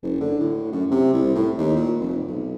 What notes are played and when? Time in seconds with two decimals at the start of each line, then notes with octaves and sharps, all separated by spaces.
0.03 F#1
0.21 D3
0.40 A2
0.72 F#2
0.91 C3
1.13 C2
1.35 A2
1.58 D#2
1.76 A#2
2.00 F1
2.28 B1